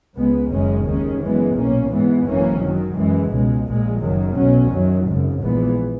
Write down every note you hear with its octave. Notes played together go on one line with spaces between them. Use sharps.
C#2 C#3 G#3 B3
F#1 F#2 D#3 G#3 C#4
D#2 D#3 G#3 C#4
F#2 E3 G#3 B3
B1 A#2 A#3 C#4
G#2 E3 G#3 B3
G#1 F#2 E3 A#3 C#4
F#2 D#3 F#3
F#2 E3 G#3
C#2 B2 G#3
A#1 A#2 G#3
F#1 F#2 D#3 F#3
B1 B2 F#3 C#4
F#2 D#3 F#3
G#1 F#2 C#3
A#1 G#2 E3 B3